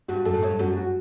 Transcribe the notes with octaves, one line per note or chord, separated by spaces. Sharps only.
G2 F#4
F#2 A4
A2
G2 C#5
F#2 F#4
F#4